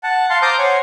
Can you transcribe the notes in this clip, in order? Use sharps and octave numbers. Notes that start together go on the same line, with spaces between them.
F#5 A5
F5 A5 C6
C5 A#5 D6 D#6 F6 G6
C5 C#5 F#5 G#5